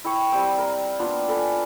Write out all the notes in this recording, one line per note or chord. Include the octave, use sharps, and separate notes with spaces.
E4 G5 C#6
G3 C4
A#4
A#3 B3 D4 F4
A4 B4 G#5